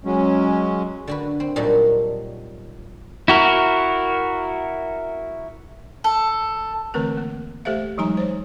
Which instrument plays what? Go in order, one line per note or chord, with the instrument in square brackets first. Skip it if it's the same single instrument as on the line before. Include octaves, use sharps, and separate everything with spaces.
[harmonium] F#3 G#3 C#4
[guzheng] D3 F#4 B4
C4
A#2 F#3 G3 D#4 F#4 A4
[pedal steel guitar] E4 F#4 A#4
[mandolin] A4
[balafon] D3 E3 A3 C4 A#4 B4
A#3
A3 G4 A4 C5 E5 F5
E3 F#3 G#3 D#4 G#5 A#5
C5 C#5